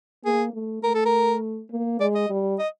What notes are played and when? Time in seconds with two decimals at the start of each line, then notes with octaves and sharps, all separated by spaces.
0.25 A#3 G#4
0.53 A3
0.83 A3 A#4
0.94 A4
1.06 A#4
1.71 A#3
2.00 G#3 D5
2.15 D#5
2.30 G3
2.59 D#5